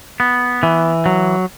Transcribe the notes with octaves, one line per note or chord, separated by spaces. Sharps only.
B3
E3
F#3